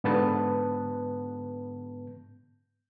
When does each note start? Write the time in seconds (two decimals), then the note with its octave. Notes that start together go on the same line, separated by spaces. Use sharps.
0.04 G#2 D3 B3 B4 A5